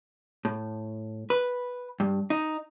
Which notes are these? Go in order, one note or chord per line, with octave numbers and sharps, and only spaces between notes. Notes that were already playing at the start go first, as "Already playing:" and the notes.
A2
B4
G2
D#4